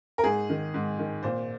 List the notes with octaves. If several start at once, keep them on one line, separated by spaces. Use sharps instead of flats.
A#4
G#2 G#4
D#3
G#2
D#3
A#2 C5